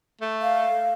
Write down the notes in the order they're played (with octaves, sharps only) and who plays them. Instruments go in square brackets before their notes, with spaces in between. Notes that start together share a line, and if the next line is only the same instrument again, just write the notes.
[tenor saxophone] A3
[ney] F5